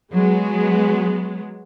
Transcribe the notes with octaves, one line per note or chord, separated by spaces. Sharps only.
F#3 G#3 B3